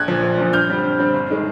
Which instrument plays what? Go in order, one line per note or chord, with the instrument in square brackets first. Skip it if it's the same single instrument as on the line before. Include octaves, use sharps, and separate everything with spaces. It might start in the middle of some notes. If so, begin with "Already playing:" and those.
Already playing: [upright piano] A#1 F#6 G#6
A#2 F3
A#1
A#2 F3
G2 F6 G6
D3 G3 C4
G2
D3 G3 C4
G1
D#3 G#3